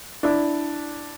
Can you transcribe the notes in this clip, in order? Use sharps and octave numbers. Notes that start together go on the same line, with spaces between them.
D4 E4